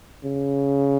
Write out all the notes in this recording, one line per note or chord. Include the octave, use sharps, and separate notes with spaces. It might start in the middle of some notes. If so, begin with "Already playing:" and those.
C#3